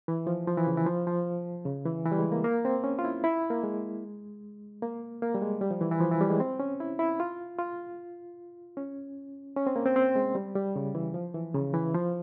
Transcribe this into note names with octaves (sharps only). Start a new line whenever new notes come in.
E3
F3
F3
E3
C#3
E3
F3
F3
C#3
E3
E3
G3
G#3
A#3
A#3
C4
C#4
F4
E4
E4
A#3
G#3
A#3
A#3
G3
G#3
G3
F3
E3
E3
F3
E3
G3
G#3
C4
C#4
E4
E4
F4
F4
C#4
C#4
C4
A#3
C4
C4
G#3
G3
G3
C#3
E3
F3
E3
C#3
E3
F3